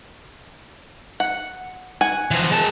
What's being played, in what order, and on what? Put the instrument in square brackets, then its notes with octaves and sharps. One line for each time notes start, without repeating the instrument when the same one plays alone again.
[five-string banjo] F#5
F#5 G#5
[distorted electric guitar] E3 F3
G#3 A5